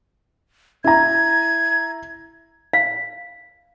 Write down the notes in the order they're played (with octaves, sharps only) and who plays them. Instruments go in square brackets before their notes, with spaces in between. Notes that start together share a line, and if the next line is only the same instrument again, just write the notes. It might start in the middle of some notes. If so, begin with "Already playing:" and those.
[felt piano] E4 A#5 [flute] G#6
[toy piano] F5